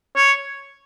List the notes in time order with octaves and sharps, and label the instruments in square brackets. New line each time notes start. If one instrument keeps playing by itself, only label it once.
[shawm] C#5